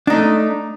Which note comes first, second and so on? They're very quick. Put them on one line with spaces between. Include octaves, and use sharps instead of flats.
D4 D#4 A3